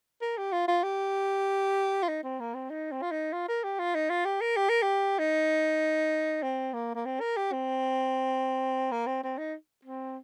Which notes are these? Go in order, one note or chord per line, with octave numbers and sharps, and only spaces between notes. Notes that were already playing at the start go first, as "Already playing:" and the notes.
A#4
G4
F4
F4
G4
F4
D#4
C4
A#3
C4
D#4
C4
F4
D#4
F4
A#4
G4
F4
D#4
F4
G4
A#4
G4
A#4
G4
D#4
C4
A#3
A#3
C4
A#4
G4
C4
A#3
C4
C4
D#4
C4